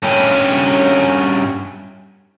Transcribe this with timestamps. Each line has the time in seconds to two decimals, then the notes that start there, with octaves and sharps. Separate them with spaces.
0.03 G2 C#4